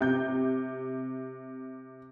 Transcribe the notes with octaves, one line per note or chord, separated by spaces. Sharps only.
C3 G6